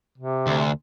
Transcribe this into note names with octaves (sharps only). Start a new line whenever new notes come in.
C3
D2